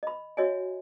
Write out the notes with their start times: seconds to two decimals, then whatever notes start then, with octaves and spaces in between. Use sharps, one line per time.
0.03 D#5 B5
0.37 F#4 C#5 D#5 E5 G#5